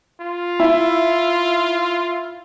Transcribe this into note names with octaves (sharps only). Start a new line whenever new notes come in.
F4
E4